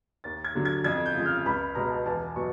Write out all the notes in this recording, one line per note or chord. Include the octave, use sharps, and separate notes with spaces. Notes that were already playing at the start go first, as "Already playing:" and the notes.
D#2 A6
G#6
D3 F#3
G#6
F2 G#6
G6
C#3 F3 G#3
F6
C#2 B5
B2 G#3 A#5
A5
E2 A5
B2 F#3 C#6